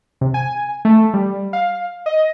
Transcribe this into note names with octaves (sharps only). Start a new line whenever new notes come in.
C3
G#5
A3
G3
F5
D#5